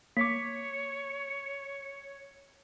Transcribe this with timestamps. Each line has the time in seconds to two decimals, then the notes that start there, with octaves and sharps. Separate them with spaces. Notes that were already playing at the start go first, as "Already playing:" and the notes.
0.17 A#3 C#5 D6 B6